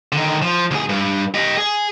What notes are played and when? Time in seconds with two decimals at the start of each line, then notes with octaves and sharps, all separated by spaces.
0.12 D3 D#3
0.42 F3
0.71 D2 G#4
0.89 G2
1.34 G4 D#5
1.57 G#4